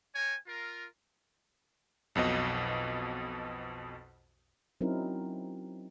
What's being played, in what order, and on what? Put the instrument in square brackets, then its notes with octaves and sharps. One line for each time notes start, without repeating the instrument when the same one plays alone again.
[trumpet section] A#4 C#5 G5 G#5
F4 A#4
[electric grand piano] B1 F2 B2 D#5
[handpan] F#3 C4 C#4 D#4 E4 A#4